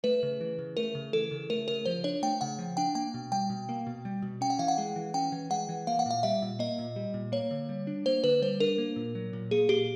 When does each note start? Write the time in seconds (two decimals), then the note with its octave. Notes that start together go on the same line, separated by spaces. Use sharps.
0.04 A3 B4
0.23 C#3
0.41 E3
0.59 C#3
0.77 A3 A#4
0.95 C#3
1.13 E3 A4
1.31 C#3
1.50 A3 A#4
1.68 C#3 A#4
1.85 F3 C5
2.04 D4 C#5
2.22 A3 G5
2.41 C#3 F#5
2.59 F3
2.77 D4 G5
2.95 A#3 G5
3.14 B2
3.32 G3 G5
3.50 B2
3.69 A#3
3.87 B2
4.05 G3
4.22 B2
4.41 C#4 G5
4.50 F#5
4.59 E3 F5
4.68 F#5
4.78 G#3
4.96 E3
5.14 C#4 G5
5.32 E3
5.50 G#3 F#5
5.69 E3
5.87 A#3 F5
5.99 F#5
6.06 A#2 F5
6.23 G3 E5
6.42 A#2
6.59 A#3 D#5
6.79 A#2
6.96 G3
7.14 A#2
7.32 A#3 C#5
7.51 D3
7.69 G3
7.87 D4
8.06 A#3 C5
8.24 D3 B4
8.42 G3 C5
8.60 D4 A#4
8.78 A#3
8.96 A#2
9.15 F#3
9.33 A#2
9.51 A#3 G#4
9.69 A#2 G4